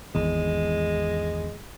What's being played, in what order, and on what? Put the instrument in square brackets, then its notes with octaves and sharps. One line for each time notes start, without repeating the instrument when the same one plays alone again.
[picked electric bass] G#1 E2 [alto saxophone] G#3